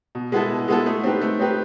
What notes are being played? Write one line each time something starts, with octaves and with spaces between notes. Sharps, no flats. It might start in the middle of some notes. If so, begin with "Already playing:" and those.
B2
G#3 B3 E4 A4
B2
G#3 B3 E4 A4
A3
C4 D#4 G4 B4
A3
C4 D#4 G4 B4